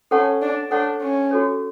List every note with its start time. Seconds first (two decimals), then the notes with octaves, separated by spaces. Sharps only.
0.11 C#4 A4 C#5 F#5 A5 C#6
0.42 D4
0.71 D4 A4 C#5 F#5 A5 C#6
1.01 C#4
1.31 F#4 A4 C#5